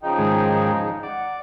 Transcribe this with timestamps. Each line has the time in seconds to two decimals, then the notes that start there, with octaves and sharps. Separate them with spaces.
0.02 C#3 F3 D#4 G5
0.18 G#2 D#3 G#3
1.03 D5 F#5